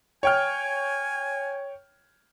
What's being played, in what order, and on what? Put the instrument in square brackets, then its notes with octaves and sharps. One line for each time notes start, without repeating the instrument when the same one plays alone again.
[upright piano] C#5 G5 F6 [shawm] G#5